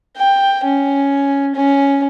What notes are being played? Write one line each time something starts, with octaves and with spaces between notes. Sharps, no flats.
G5
C#4
C#4